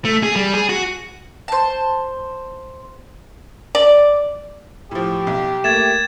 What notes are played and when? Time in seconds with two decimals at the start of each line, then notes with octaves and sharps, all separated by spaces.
0.05 A3
0.23 G#4
0.36 G3
0.54 G#4
0.69 F#4
1.48 C5 A5
3.75 D5
4.91 A2 F3 G4
5.27 B1
5.64 A3 A#3 G#6 A6 E7